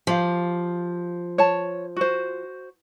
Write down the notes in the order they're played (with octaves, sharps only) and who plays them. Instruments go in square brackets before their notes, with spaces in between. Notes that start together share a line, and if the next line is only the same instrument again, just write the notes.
[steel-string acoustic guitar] F3 [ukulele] G4 F5
[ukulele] C#5 A5
F#4 C5